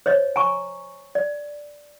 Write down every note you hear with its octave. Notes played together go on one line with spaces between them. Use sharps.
C5 C#5 D#5
G#5 A#5 C#6
D5